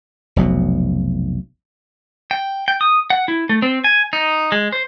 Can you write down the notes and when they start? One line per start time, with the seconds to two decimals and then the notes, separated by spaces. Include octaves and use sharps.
0.36 F1 B1 B2
2.31 G5
2.68 G5
2.81 D#6
3.10 F#5
3.28 E4
3.49 A3
3.62 C4
3.84 G#5
4.13 D#4
4.52 G#3
4.72 C5